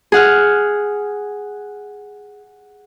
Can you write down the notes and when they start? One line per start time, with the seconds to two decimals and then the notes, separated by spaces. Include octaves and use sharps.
0.12 G#4 F#5 F6